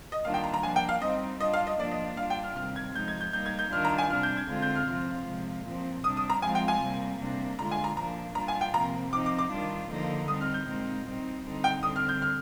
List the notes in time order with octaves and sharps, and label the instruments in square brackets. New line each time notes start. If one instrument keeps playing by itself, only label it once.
[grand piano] D#5
[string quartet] D#3 G3 A#3 D4 F4 [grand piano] F5
[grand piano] G5
A#5
A#5
[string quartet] F3 A#3 D4 [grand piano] G#5
[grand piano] G5
F5
[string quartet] G3 C4 D#4 [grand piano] D#5
[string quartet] G3 D4 F4 [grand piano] D#5
[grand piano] F5
D#5
[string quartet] F3 A#3 D4 F4 [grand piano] D5
[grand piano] D#5
[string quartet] G3 D4 F4 [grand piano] F5
[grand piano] G5
F6
[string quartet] C3 D#3 G3 [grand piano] F6
[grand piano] G#6
[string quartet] F3 G#3 D#4 [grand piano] G6
[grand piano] G#6
G6
[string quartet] G3 A#3 D#4 [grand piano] G6
[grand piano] G#6
G6
[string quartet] D#3 G3 D4 F4 [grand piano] F6
[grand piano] A#5
G#5
[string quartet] C3 G3 D4 [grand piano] F6
[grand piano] G6
G#6
[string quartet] D3 G#3 C4 F4
[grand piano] G6
F6
[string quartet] C3 F3 C4 F4 [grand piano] F6
[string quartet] C3 F3 G#3
A#2 F3 C4
[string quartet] C3 G3 D4 [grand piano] D#6
[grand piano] D#6
A#5
[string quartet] F3 G#3 C4 F4 [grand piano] G#5
[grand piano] G5
G#5
[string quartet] C3 G3 A#3
C3 G3 A#3 D4
[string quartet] D3 G#3 D4 F4 [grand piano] A#5
[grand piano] G#5
A#5
[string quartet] A#2 F3 A#3 D4 [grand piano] A#5
[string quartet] A#2 G3 D4 F4 [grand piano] A#5
[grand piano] G#5
G5
[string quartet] C3 F3 A#3 [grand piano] A#5
[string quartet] F3 C4 D#4 [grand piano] D6
[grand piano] D6
D6
[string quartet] D#3 G3 D4 F4
D3 F3 A#3 D#4
[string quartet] G3 C4 D#4 [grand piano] D#6
[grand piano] F6
G6
[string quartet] A#2 G#3 C4 D#4
G3 C4 D#4
D3 G3 C4 D#4
[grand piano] G5
[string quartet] D3 G3 C4 [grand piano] D#6
[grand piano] F6
G6
F6